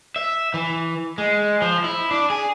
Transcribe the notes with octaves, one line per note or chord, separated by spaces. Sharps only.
E5
E3
G#3
F3
E4
D4
G#4